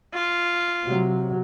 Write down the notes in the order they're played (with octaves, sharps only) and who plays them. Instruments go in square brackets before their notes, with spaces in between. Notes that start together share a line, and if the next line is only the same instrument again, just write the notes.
[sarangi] F4
[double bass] C3 F#3